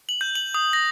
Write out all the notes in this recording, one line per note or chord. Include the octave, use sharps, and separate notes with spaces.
F#7
G6
F#7
D#6
A#6